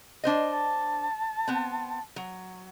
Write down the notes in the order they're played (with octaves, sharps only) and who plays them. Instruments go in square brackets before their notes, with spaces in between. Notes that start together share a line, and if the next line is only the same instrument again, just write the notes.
[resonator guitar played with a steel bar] D4 C5 D#5
[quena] A5
[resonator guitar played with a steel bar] B3 C4
F#3